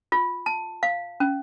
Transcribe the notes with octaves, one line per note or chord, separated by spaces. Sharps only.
F4
A5
F5
C#4